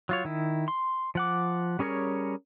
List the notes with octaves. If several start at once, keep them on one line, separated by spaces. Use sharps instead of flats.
F#3 F4 C#5
D#3 E4
C6
F3 F#5 D6
G3 C#4 G#4 A#4 C#5